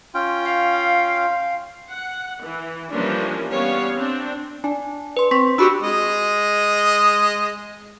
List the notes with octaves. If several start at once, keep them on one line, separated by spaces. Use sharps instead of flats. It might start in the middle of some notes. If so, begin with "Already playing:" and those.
C#4 F4 G5
F5
F#5
E3
E3 F3 G3 A#3 C#4 D4
G3 B3 C#4 C#5 F5
C4 D4
D4 G#5
B4 C6
C4 C6 C#6 B6
D4 F#4 G4 B5 E6
G#3 D#5